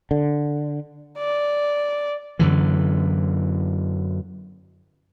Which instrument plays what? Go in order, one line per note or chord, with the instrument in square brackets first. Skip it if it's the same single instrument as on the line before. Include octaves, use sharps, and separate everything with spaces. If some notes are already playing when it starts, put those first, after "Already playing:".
[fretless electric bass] D3
[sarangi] D5
[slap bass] F#2 D3 E3